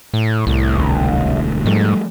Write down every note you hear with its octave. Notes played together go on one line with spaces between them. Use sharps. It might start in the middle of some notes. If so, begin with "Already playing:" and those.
A2
C2 A2
E1 D2
G#2 F3 G3 A3